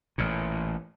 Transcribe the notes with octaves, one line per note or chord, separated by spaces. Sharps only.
A1 A#2